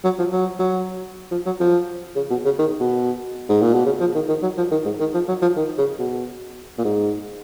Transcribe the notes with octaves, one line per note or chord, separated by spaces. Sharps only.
F#3
F3
F#3
F#3
F3
F#3
F3
C#3
B2
C#3
D#3
B2
G#2
A#2
B2
C#3
F3
D#3
D#3
F#3
F3
D#3
G#2
D#3
F3
F#3
F3
D#3
C#3
B2
A#2
G#2